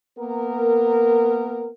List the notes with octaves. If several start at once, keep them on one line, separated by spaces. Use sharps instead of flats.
A#3 B3 A#4